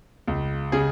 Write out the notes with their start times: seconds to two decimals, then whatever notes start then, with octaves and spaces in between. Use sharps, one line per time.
0.28 C#2
0.72 C#3 G#4